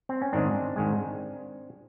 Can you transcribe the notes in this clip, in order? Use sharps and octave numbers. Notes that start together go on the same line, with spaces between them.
C4
C#4
G#2 D#3 G#3 C4 D4
G#2 D#3 G#3